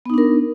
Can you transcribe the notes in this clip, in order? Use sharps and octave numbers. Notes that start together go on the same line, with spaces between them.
B3 D4 D#4 A#4